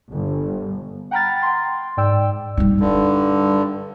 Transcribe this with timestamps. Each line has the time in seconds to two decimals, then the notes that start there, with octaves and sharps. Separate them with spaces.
0.13 G1
1.11 F#5 G5 A#5 B5 F6 A6
1.42 G5 C6
1.97 G#2 D5 G5 E6
2.57 G3 D#4
2.80 G2 D3